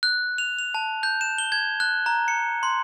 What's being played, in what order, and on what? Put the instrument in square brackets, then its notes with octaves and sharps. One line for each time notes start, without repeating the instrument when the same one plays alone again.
[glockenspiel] F#6
F7
F7
A5
G6
E7
G7
G#6
F#6
A#5
C#7
C6